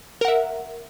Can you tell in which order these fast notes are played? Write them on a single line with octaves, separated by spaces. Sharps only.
A#4 F#5 E5